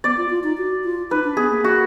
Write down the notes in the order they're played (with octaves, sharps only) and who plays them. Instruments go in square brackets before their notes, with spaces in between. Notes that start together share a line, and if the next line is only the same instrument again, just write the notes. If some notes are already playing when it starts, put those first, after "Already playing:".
[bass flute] B3 [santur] D5
[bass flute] F4
F4
D#4
F#4
F4
[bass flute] D#4 [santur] B4
[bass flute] D4
[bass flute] B3 [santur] G#4
[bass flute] A#3
[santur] F#4